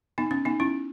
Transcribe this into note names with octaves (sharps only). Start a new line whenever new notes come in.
B3 D#4
C#4
B3 D#4
C#4 E4